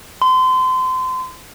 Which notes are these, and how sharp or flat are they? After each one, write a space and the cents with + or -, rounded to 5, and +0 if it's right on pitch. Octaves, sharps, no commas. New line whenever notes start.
C6 -30